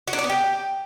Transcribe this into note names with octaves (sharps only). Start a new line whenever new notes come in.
F#4
D4
D5
B3
G4